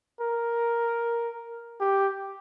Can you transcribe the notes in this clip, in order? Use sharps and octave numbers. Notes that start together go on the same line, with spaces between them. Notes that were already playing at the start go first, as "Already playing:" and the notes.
A#4
G4